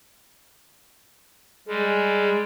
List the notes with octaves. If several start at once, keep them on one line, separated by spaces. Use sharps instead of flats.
G3 G#3 G#4